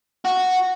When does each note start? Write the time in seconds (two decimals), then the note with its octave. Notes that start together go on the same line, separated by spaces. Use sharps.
0.25 F#4